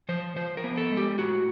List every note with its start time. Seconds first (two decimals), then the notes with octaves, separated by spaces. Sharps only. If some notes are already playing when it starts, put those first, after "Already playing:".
0.09 F3 C5
0.36 F3 C5
0.57 A#4
0.64 B3
0.77 A4
0.91 G#3
0.97 G4
1.18 A2 F#4